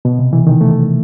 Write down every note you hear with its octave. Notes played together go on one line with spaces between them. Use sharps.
B2
C3
E3
D#3
A3